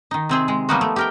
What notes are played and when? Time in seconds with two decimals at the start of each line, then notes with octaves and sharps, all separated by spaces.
0.11 D#3 D#4
0.29 C3 C4 G#4
0.48 G#3
0.69 F3 G3 A#3 B3 D#4 F#4
0.81 A3
0.96 G4 A#4 G5